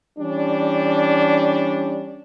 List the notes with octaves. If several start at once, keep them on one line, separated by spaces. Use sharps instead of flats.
E3 G3 C#4 D4